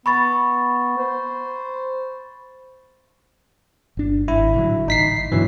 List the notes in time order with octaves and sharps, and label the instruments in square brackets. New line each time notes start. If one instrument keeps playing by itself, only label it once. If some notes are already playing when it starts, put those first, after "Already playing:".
[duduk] B3 [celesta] B5 C#6 A6
[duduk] C5
[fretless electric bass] G1 D4
[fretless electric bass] G#1 [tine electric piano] E4
[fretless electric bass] A2 D3 F#3
[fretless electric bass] A1 [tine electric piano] D#4 B6 C7
[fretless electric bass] G2 B2 D3 [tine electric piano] E3 F#3